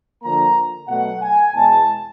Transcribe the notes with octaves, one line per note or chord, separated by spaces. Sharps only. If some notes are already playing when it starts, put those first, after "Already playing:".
D3 F3 A#3 A#5
B2 F#3 A3 F#5
G#5
E2 B2 G#3 A5